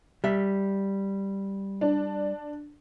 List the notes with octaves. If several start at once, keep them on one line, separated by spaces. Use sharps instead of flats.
G3 E5
D4